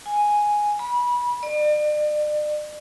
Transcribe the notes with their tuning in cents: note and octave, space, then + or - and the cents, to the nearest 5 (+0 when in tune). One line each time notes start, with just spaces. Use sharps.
G#5 +0
B5 -25
D5 +40